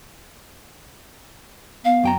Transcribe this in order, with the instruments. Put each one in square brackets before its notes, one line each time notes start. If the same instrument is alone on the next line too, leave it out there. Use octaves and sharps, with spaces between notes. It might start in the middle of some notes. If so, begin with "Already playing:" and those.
[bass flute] B3 [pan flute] F5
[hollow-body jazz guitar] F#2 G5 A#5